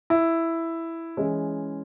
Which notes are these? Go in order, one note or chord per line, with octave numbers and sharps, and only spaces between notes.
E4
E3 G#3 C#4